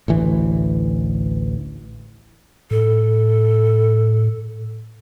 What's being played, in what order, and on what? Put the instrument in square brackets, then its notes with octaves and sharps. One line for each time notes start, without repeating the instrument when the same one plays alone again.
[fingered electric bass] A1 D2 E3
[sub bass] A2 [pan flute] A4